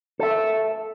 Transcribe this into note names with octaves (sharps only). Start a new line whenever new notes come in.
A4 E5